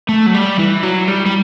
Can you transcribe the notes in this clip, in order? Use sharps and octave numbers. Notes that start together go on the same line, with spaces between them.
A3
F#3
G3
E3
F#3
G3
G3